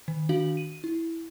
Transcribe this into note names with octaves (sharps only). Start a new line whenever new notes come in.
D#3
D#3 D4 F#4 F5 F#7
D#7
E4